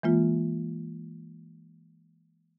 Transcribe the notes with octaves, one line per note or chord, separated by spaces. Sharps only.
E3 G#3 A#3 F4